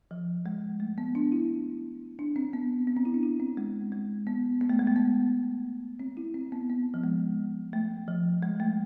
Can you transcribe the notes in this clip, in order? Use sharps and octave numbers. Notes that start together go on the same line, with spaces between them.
F3
G#3
A3
B3
D4
E4
D4
C4
B3
B3
C4
E4
D4
E4
C4
G#3
G#3
B3
B3
A3
G#3
A3
B3
C4
E4
C4
B3
B3
F3
G#3
A3
F3
G#3
A3